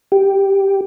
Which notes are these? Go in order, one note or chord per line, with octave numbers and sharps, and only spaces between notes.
G4